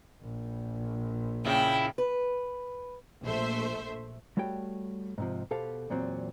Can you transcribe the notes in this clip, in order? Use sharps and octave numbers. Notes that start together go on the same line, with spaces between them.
A#1
A#2 C#3 E4 G5
B4
A#1 A3 C5 E5
G3 A3 F#4 C#5 G5
G#2 C3 F3
B2 G4 A4 C5 F5
E2 A#2 F#3 C4